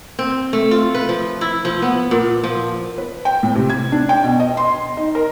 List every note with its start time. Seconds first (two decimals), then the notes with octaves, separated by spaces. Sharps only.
0.19 C4
0.53 A3
0.71 F4
0.95 B4
1.09 F3
1.41 E4
1.65 F3
1.82 B3
2.11 A#2
2.44 F3
2.98 B4
3.25 G5
3.43 A2
3.55 C3
3.70 G#6
3.92 D4
4.09 G5
4.24 B2
4.40 D#5
4.57 C6
4.97 D#4
5.15 A#4